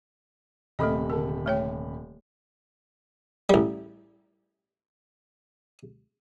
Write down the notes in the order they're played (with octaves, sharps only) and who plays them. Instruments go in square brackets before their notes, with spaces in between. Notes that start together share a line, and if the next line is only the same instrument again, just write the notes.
[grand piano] D#1 C3 B5 [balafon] A3 A4 D#5
[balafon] D3 A#4
A3 C#5 G5
[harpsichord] A1 G3